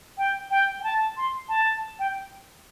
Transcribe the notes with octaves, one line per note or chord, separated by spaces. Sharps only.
G5
G5
G5
A5
C6
A5
G5